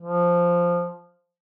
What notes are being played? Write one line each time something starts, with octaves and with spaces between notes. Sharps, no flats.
F3